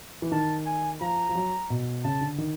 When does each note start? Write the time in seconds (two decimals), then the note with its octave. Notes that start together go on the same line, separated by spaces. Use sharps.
0.22 E3
0.32 D#3 A5
0.66 G#5
1.01 F3 A#5
1.29 F3
1.35 F#3
1.70 B2
2.04 C#3 A5
2.21 D3
2.38 D#3